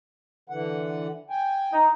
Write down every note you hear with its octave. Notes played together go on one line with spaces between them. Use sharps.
D3 E3 F#5
G5 G#5
D#4